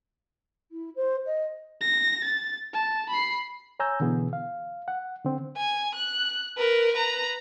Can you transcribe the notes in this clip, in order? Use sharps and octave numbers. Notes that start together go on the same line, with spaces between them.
E4
C5
D#5
A#6
A6
A5
B5 C7
C#5 G#5 A#5 E6 G6
B2 D3 E3 B3 G#4
F5
F#5
D3 C4
G#5
F#6
A#4 B4
B4 A#5